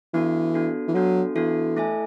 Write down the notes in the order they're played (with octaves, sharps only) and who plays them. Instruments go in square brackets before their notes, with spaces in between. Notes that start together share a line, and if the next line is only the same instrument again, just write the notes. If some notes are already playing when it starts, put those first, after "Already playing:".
[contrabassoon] E3 [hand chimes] B3 D4 F#4 A4
[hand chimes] B3 D4 F#4 A4
[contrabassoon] E3
[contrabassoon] F#3 [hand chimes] B3 D4 F#4 A4
[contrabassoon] E3 [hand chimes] B3 D4 F#4 A4
[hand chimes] A3 E4 A4 E5 G#5